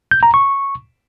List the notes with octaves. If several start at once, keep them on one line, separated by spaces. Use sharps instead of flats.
G6
A#5
C#6